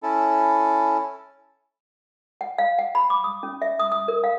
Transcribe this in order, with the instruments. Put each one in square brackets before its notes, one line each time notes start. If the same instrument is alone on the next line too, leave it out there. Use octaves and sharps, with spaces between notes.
[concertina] C#4 E4 A4
[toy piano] F#5
F5
F#5
B5
D6
D#6
C#4
E5
D#6
D#6
A#4
F5